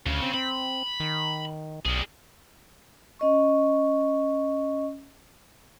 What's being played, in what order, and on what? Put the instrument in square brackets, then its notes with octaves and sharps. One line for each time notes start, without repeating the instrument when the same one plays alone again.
[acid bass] D2 [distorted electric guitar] C#3
[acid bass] C4
[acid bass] C4 [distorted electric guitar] B5
[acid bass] D#3
[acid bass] B1 [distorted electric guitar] G3 G#4
[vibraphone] C#4 D#5 C#6